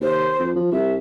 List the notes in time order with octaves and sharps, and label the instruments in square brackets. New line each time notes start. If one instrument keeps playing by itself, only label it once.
[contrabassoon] D#2 [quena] C5
[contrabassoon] F2
F3
[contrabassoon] C2 [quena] E5